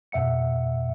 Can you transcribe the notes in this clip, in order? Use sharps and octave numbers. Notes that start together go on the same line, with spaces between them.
F2 B2 E5 F#5 C#7